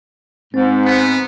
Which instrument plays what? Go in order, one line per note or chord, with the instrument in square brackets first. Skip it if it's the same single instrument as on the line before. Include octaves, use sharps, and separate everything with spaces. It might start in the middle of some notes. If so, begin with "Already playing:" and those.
[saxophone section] G#2 [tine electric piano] C4
[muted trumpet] B3